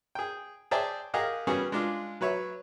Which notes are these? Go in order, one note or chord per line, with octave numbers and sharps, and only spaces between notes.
G#4 G5
G#4 C5 D5 E5 G5 A5
G4 G#4 A#4 D#5 F5 F#5
G3 B3 C#4 F#4 G#4 C#5
G#3 D4 F4
F#3 B4 C#5 E5